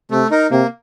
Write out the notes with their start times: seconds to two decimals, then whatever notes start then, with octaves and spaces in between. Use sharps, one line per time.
0.11 C3 A3
0.31 D#4 A#4
0.51 C3 A#3